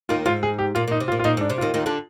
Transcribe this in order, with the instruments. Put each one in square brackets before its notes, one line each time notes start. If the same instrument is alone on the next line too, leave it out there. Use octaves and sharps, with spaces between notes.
[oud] D#2 D#3 [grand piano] F4
[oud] G#2 [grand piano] F4
[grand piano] G#4
G4
[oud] A#2 [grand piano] F4
[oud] A#2 [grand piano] D#4
[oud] C3
[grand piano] F4
[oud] A#2
[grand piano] F4
[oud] A#2 [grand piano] D#4
[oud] G#2 [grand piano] D4
[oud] C3
[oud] D#2 D#3 [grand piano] F4
[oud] D#2 D#3
D3 D4